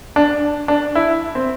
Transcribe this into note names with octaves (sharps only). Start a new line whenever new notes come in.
D4
D4
E4
C4